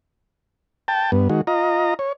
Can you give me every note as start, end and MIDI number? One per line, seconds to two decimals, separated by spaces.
0.88 1.11 79
0.88 1.11 81
1.12 1.28 43
1.12 1.28 59
1.29 1.41 51
1.29 1.41 56
1.29 1.41 66
1.47 1.94 65
1.47 1.94 75
1.47 1.94 82
1.99 2.12 73